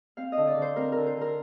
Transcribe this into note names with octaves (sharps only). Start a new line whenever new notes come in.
C4 F5
D#5
D3
D5
D3
C5
C4 A#4
D3 A#4
C5
D3 A#4